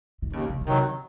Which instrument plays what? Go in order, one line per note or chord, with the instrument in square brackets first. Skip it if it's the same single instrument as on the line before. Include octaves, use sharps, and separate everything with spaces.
[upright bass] D#3
[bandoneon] D#2 [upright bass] C#3
[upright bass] C#3
C#3
[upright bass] C3 [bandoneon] D#3 F#3